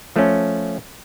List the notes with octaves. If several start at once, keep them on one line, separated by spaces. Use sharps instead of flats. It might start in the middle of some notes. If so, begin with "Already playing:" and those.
F3 A3 C#4